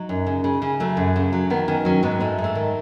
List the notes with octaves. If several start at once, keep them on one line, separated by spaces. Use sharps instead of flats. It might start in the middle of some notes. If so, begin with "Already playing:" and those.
Already playing: F#3 D#4
F#2
C#3
C#3
C#3
F#3 A3
F#2
C#3
F#3
D#3 B3
D#3 C#4
F#3 C#4
G#2 B3
G#2 A3
G#2
A3
D#3